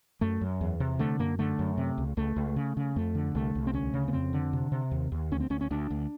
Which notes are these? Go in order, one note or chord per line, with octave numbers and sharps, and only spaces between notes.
F#2 A3
F#2
E2
C3
D3 A3
F#2 A#3
D3 A3
F#2
C3
C#2
C#2 A3
C#2
C#3
C#3
F2 A3
D3
C2 A3
C2
C4
D2 C#4
C#3
B3
F2 C4
D3
C3
C3
D#2
D#2
D2 C#4
C4
D2 C#4
C#4
D2 D4
D2